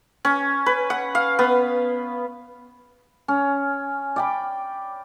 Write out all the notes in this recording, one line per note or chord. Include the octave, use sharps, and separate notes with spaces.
C#4
B4
F#5
F5
B3
C#4
D5 G5 B5